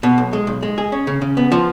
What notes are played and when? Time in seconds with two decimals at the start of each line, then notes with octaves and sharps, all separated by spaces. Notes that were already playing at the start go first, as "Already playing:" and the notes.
0.03 B2
0.18 B1
0.33 G#3
0.47 B1
0.63 G#3
0.78 G#4
0.92 C#4
1.07 C#3
1.22 C#3
1.37 B3
1.52 F3